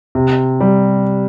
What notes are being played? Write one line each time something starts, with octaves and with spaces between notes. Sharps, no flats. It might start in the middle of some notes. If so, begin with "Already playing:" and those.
C3
G3